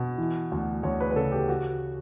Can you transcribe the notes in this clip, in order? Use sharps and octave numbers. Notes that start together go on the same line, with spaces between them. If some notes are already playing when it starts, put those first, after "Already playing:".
Already playing: B2
E3
D2
D2 C#5
B4
B4
C#3 A4
G4
F#4